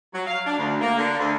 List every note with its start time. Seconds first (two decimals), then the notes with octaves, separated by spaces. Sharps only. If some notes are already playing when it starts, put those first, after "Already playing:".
0.14 F#3
0.27 F5
0.46 D4
0.58 D2
0.81 A#3
0.98 D3
1.19 D2